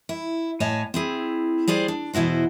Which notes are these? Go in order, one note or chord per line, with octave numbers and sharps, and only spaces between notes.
E4
A2 C#5 D#5 G#5 A5
C4 E4 G#4
G3 G#4 C5 D5
D4
E2 B2 E4 F#4 C5